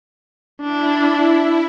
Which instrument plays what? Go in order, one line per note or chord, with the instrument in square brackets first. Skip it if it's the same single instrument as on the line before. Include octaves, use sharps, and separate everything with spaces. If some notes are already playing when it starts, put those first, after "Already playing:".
[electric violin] D4 [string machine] E4